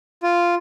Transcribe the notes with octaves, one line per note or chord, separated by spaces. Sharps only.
F4